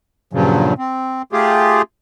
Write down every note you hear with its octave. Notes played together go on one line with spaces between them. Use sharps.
G2 A#2 C#3 F3 F#3
C4
A3 F4 G4 G#4